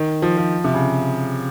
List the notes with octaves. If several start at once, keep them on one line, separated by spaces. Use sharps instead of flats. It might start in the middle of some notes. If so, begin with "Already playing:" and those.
Already playing: D#3
F3
F3
C3
C#3